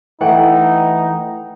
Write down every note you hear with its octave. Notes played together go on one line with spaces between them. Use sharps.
E3 A3 D#4 F#5 G5